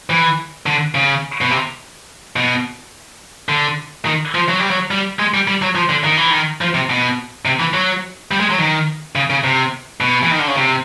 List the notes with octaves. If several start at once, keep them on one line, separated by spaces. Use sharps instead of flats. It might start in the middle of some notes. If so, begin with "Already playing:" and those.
E3
D3
C#3
B2
C3
B2
D3
D#3
F3
F#3
G3
F#3
G3
G#3
G3
G3
F#3
F3
D3
D#3
E3
D#3
F3
C3
B2
C3
E3
F#3
G3
G#3
F#3
D#3
C#3
C#3
C3
B2
E3
D#3
D3
C#3
C3